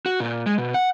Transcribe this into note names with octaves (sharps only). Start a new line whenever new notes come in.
F#4
A#2
G#3
B2
F#5